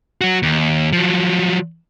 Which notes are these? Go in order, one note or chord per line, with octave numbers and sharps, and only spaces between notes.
F#3 F#4
D#2
F3 F#3